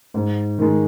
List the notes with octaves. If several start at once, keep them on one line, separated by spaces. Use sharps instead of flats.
G#2
D#3 G#3